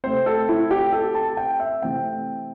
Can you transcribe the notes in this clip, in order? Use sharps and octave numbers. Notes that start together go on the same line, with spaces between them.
C3 A3 C4 C5
A4
E4
G4
A4
A5
G5
E5
C3 E3 A3 C4 G5